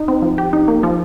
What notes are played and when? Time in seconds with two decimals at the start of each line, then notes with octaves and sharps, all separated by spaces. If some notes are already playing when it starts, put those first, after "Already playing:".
Already playing: D#4
0.08 C4
0.22 F3
0.38 G4
0.53 D#4
0.68 A#3
0.83 F3